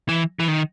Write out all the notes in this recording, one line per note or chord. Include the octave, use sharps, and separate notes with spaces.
E3
E3
D#3